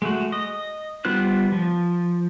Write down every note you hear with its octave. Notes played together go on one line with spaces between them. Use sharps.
G#3 A3 F#4
D#5
G3 B3 F4 C5 F#6
F3